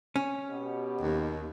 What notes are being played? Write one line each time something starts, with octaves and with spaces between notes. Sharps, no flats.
C#4
B2 G4
D#2